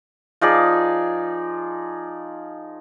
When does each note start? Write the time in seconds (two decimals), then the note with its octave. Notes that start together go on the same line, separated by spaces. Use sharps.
0.41 F3 D#4 G#4 D5